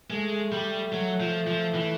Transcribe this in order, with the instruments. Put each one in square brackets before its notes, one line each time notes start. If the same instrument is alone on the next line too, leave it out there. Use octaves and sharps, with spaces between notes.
[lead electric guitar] G#3 [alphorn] A3
[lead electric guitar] G3
F#3
F3
F3
E3